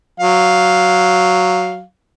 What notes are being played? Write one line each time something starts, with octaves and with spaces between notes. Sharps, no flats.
F#3 F5